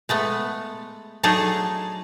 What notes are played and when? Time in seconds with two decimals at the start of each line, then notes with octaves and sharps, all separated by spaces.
0.09 G#3 A3 B3
1.23 F#3 A3 D4 D#4 G#4 A4